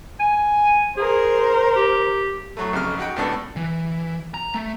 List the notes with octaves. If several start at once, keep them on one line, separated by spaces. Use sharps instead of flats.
G#5
G#4 A#4 C5
G4
A2 F#3 A3
B1 F2 C#3 F6
D#4 F#4 F#5 G5
C#2 A2 B3 D4 A4
E3
A#5
A3